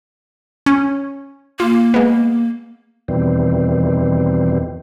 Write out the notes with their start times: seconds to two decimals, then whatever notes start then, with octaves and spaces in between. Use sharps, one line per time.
0.66 C#4
1.60 A#3 F4
1.94 G#3 B3
3.08 E2 B2 D#3 E3 G3 C4